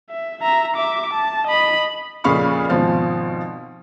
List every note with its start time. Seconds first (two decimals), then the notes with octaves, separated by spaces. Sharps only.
0.10 E5
0.42 E5 A#5
0.77 E5 D6
1.13 A5
1.47 D#5 B5
2.24 F2 A#2 C#3 F5 B5 C#6
2.69 G#1 B2 F3 F5